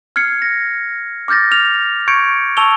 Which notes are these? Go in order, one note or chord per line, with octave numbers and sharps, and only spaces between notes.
F6 G#6 C7 C#7
A#6
D6 F6 G6 A6 A#6
F6 F7
C#6 G6 G#6 C#7 D7
A5 C#6 E6 F7 G7